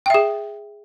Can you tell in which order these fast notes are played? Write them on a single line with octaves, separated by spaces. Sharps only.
G5 E5 G#4